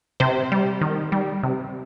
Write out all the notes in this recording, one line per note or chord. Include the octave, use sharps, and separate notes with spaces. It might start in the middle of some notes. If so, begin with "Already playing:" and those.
C3 C5
G3
D#3
G3
C3